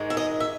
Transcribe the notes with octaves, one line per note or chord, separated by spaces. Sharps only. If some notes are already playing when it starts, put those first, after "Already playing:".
Already playing: G#2 D#3 G#3
E5
D#5
E5